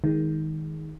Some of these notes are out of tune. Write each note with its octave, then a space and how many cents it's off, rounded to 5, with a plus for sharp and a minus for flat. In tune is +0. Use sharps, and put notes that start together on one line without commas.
D#3 +15 G#3 +0